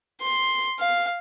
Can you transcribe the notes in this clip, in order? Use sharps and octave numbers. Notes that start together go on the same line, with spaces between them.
C6
F5